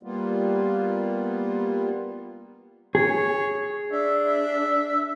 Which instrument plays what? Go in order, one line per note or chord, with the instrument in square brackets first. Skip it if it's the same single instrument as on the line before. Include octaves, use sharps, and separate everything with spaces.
[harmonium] G3 A#3 B3 F4
[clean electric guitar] G#4 [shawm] C#5
[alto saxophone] D4 [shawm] E5
[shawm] E5